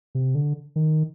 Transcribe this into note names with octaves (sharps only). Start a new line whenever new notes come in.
C3
D3
D#3